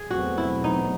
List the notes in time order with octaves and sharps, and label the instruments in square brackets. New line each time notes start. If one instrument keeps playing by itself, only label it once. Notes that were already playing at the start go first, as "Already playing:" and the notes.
Already playing: [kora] G#4
[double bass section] E2 B2 F#3 A3 C4 [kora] F#4
[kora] E4
D#4